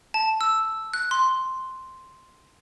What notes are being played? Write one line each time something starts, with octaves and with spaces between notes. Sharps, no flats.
A5
E6
F#6
C6